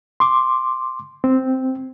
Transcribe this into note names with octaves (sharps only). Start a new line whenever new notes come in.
C6 D6
C4